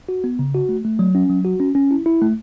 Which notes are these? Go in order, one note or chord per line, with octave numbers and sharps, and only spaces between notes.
F#4
B3
C#3
F#4
A3
A3
F#3
C#4
F#3
F#4
C#4
C#4
E4
E4
A3